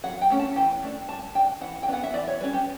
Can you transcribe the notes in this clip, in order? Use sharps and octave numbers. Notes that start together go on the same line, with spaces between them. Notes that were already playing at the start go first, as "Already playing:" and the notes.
F#3 F#5
G5
A3 C#4
A5
E3 G5
A3 D4
G3 A5
D4 G5
E3 F#5
G5
B3 D4 F#5
E5
E3 D5
C#5
G3 C#4 B4
G4